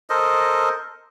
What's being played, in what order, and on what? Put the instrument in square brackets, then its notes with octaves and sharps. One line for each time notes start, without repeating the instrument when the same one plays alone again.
[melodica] A4 A#4 C5 D#5